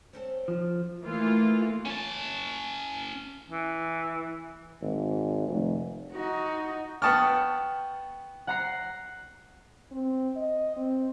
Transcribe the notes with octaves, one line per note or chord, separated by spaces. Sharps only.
C4 C#4 A4
F3
E3 A3 A#3 F4
C#4 A5
E3
G#1
F1
D#4 F#4
B3 G5 A5 C#6 D#6 F6
F#5 A#5 C7
C4
D#5
C4